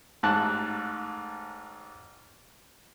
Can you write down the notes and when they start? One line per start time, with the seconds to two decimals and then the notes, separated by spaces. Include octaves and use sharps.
0.23 A1 G#2 A5 F#6